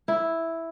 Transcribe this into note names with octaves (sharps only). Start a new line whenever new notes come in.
E4